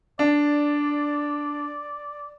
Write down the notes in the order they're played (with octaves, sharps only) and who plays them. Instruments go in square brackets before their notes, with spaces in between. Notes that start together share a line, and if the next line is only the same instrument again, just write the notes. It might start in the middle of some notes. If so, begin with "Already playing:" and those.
[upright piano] D4 [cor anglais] D5